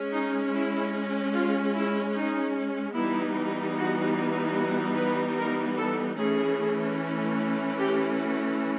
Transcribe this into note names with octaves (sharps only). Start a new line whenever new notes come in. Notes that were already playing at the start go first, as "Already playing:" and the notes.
Already playing: G#3 C#4
D#4
E4
F4
E4
D#4
E3 G3 B3 D#4 E4
F#4
F#4
B4
A#4
A4
E3 A3 C#4 G#4
G4
F#4